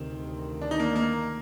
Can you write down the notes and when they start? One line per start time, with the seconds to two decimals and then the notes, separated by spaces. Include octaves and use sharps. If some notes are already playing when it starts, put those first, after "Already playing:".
Already playing: D2 C3 D#3 C4
0.61 D4
0.71 D#4
0.80 A#3 D4
0.96 A#3